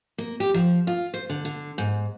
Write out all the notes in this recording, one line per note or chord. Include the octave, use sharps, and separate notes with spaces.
A#3
G4
F3
F4
C5
D3
D3
G#2